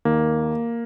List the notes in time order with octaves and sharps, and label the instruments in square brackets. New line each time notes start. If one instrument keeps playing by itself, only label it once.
[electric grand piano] D#2 D#3 A#3